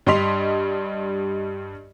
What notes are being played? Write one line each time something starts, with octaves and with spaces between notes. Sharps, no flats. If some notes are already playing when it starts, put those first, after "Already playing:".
G2 G3 D#5 C6 B6 F7